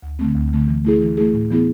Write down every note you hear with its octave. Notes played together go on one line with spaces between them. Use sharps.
D2
D3 A3 C4
D2
D3 A3 C4
E3
A3 E4 G#4
E3
A3 E4 G#4
A2
E3 B3 E4 G#4